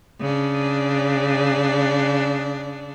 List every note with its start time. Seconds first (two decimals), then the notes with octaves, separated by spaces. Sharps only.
0.20 C#3 D4